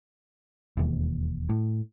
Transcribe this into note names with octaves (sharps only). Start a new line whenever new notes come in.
E1 D#2
A2